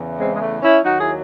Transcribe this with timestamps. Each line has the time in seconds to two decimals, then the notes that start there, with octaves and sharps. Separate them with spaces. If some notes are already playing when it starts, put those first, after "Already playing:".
Already playing: E2 C#3 E3
0.19 G#3 C4
0.35 G#3
0.41 A3
0.62 C#4 E4
0.83 D#2 D#3 F#3 D#4 F#4
1.00 E4 G#4